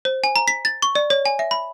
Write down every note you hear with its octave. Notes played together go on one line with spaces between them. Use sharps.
C5
G#5
A#5
B6
A6
C#6
D5
C#5
G#5
E5
B5